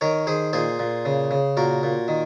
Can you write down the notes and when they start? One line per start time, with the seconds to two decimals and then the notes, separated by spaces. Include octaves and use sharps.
0.01 D#3 A#4 C#5
0.27 D#3 G#4 C5
0.53 A#2 G#4 C5
0.79 A#2
1.05 C#3
1.31 C#3
1.57 A#2 F#4 A#4
1.83 A#2
2.08 D#3